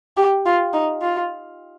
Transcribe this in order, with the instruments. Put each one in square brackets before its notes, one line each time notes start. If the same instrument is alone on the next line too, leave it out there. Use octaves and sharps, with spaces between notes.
[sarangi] G4
F4
D#4
F4